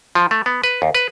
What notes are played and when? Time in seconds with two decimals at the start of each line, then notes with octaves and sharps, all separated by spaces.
0.15 F3
0.31 A3
0.46 B3
0.63 B4
0.82 D#2
0.95 B4